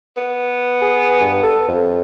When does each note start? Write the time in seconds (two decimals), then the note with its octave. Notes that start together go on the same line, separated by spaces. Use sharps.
0.17 B3
0.81 G#4
1.21 G2
1.43 A4
1.68 F2